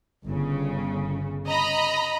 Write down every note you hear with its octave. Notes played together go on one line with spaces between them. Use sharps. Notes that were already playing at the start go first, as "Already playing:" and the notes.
G1 C#3
D#5 A#5 B5